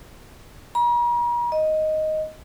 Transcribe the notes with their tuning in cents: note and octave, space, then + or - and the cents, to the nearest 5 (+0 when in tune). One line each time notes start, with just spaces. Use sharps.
A#5 +45
D#5 +0